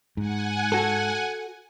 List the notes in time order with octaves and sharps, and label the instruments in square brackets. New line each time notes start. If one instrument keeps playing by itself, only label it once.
[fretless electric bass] G#2 [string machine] F#5 G#5
[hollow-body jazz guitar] F#4 A4